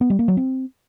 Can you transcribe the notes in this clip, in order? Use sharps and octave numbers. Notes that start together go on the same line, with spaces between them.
B3
G3
A#3
F#3
C4